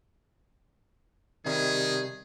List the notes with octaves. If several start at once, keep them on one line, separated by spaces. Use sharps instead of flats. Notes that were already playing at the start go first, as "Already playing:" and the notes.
C3 D#3 G3 G#4